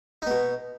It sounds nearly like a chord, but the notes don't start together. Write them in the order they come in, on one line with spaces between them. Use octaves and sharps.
D#4 B3 B2